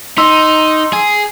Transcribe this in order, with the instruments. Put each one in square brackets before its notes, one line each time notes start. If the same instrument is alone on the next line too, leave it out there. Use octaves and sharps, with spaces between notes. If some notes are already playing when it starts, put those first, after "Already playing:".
[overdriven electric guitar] D#4 [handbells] C6 E6
[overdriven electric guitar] G#4